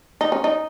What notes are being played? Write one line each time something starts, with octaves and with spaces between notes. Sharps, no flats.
D#4
C#4
D#4